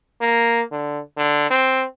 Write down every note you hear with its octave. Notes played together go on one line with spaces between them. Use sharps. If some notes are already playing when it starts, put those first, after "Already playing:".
A#3
D3
D3
C4